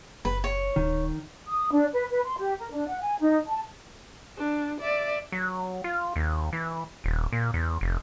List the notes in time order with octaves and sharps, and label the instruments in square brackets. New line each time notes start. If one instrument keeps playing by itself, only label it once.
[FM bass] F#1 [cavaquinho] B4
[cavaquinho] C#5
[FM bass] D1 [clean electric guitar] D#3
[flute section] D#6
D4
B4
B4
C6
G4
A#4
D4
F#5
G#5
D#4
A5
[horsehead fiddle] D4
D5 E5
[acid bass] F#3
F4
D#2
E3
D#1
A#2
E2
F1